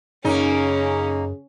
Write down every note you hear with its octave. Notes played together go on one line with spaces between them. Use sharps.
F#2 C#3 A#3 C#4 D#4